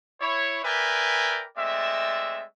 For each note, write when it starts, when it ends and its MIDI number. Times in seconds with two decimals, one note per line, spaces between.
0.22 0.60 64
0.22 0.60 73
0.64 1.45 70
0.64 1.45 71
0.64 1.45 74
0.64 1.45 76
0.64 1.45 79
0.64 1.45 80
1.58 2.44 56
1.58 2.44 57
1.58 2.44 60
1.58 2.44 74
1.58 2.44 76